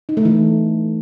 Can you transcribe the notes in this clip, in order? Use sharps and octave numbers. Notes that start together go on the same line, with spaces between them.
D#4
A3
E3